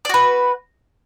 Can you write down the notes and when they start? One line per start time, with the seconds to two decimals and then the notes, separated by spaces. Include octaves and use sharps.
0.05 D5
0.09 F#4
0.14 B4